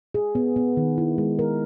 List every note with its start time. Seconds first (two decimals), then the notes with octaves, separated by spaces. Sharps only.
0.14 G#4
0.35 B3
0.56 B3
0.77 D#3
0.98 E4
1.18 G#3
1.39 A#4